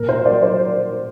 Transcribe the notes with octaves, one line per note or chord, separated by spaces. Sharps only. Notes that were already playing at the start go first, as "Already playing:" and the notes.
Already playing: A#2 A#4
C5
F#3 D5
C5